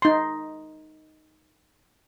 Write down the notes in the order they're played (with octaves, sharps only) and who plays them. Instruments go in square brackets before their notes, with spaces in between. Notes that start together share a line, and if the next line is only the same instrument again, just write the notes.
[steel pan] D#4 C6